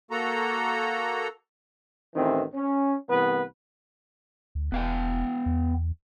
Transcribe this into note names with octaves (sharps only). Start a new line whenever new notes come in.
A#3 F#4 A4 A#5
A1 D#3 E3 C4
C#4
C2 E3 B3 B4
D2
E1 B3 F5 G5
E2